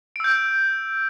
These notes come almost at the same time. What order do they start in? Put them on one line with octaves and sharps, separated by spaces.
D7 E6 G6